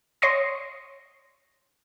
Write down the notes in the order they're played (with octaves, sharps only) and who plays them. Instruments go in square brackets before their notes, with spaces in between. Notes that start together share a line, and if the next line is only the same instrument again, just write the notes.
[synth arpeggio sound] C#5 C6 C#6 D#6 A#6